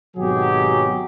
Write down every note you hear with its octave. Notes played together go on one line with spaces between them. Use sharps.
G#1 B2 F#3 G4 G#4